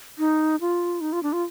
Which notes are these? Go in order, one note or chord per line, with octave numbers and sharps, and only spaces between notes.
D#4
F4
D#4
F4
D4
F4